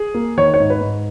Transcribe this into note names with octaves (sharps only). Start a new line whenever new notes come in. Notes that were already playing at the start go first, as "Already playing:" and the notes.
Already playing: G#4
A#3
D#3 C#5
C#5
G#2
B4
G#2